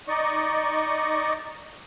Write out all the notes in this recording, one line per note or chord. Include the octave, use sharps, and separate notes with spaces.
D#4 D5 D#5 C#6